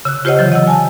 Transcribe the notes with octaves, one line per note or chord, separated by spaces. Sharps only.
C#3 E6 F#6
F4 G4 C5 C#5 D#5 F#5
D3 E3 F#3
D#5 F#5 E6
G#5 A5